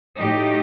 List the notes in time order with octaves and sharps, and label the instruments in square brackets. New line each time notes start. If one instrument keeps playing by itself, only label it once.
[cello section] A2 F#3 A3 D#4 G4